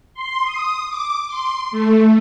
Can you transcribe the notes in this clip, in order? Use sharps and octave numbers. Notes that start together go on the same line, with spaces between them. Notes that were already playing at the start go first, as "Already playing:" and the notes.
C6
D#6
D6
C6
A3